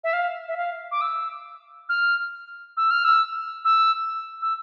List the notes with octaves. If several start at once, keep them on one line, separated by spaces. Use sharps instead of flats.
E5
F5
E5
F5
D6
E6
F6
E6
F6
E6
E6
E6